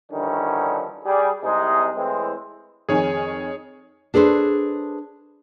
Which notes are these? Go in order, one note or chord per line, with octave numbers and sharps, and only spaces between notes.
G2 D3 D#3 F3 C#4 E4
G3 G#4
C2 C3 G#3 D#4 G#4
A2 E3 G#3 C4
F2 D#3 G#4 C#5 G#5
D4 G#4 A4 B4 C5